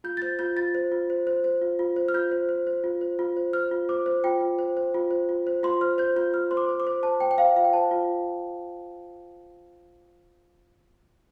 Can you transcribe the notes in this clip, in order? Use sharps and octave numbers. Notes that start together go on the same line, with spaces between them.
F4 G6
A6
C5 G6
F4 G6
F4 A6
C5
F4
C5
C5
C5
F4
F4
C5
F6
F4 G6
C5
C5
C5
F4
C5
F4
C5
C5 F6
F4
C5 D6
C5
F4 G5
F4
C5
C5
F4
C5
F4
C5
F4 C6
C5 F6
C5 G6
F4 G6
F4 F6
C5 C6
D6
C5
D6
C5
C5 A5
C5 G5
G5
C5 F5
F4 F5
G5
C5 A5
F4